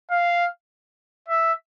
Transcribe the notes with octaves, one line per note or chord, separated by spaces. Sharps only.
F5
E5